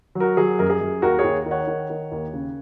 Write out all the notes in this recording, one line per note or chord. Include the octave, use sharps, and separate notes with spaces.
F#3
F#4 A#4
F#3 G#4
F#2 A#4
G#4
F#2
D#2 F#4 A#4
G#4 C#5
D#2
D#3
C#5 F#5
D#3
D#3
D#2
C#3